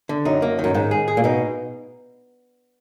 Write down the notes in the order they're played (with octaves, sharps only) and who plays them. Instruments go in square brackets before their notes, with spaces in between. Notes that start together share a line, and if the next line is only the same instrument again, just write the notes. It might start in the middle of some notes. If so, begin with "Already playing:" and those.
[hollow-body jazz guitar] D3
[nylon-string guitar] F#2 [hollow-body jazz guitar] D#4
[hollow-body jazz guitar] A#3
D#3
[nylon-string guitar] F#2
[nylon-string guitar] G#2 [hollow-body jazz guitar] D#3
[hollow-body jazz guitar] G#4
G#4
[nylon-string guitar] A#2
[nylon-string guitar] B2 [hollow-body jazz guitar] D#4